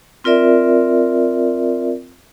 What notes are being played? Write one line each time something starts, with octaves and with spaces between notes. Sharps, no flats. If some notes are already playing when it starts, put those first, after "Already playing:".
C4 F4 A#4 D5 E5